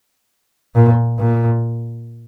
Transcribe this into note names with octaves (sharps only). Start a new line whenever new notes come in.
A#2
A#2